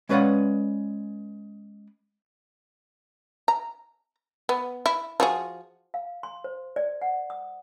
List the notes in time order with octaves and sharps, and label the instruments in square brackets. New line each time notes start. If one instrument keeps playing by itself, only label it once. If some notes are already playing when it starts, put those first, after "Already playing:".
[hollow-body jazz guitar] G#3 C#4 B4 D5 F5 F#5
[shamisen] A#5
B3
E4
F3 F#4 G#4
[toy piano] F5
C6
C5
D5
F#5
D#6